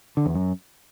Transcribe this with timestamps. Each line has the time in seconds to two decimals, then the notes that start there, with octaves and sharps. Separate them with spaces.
0.17 D3
0.26 E2
0.34 F#2